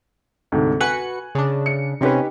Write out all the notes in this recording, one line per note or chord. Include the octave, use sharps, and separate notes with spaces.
D2 G#2 C3
F#4 B4 G#5 F#6 C#7 F#7
C#3 D4
C#7
C3 C4 C#4 D#4 G4 B4